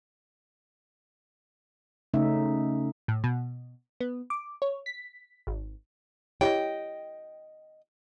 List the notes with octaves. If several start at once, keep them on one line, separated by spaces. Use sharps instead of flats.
C#3 A3 C#4 D#4 E5
A2
B2
B3
D6
C#5
B6
G#1
E4 G4 C#5 D#5 E5 G5